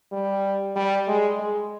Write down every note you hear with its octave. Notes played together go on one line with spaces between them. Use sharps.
G3
G3
G#3
G#3